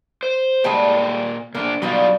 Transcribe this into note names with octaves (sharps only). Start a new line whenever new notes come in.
C5
A#2 G3 G#3 G5 A5
A#2 D4 A#4
B2 F#3 G3 B3 D#4 F4